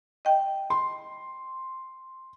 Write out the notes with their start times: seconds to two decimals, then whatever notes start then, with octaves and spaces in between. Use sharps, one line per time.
0.25 D#5 G5
0.70 C6